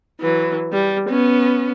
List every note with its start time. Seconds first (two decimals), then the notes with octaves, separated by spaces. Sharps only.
0.21 E3 F#3
0.72 G3
1.09 B3 C#4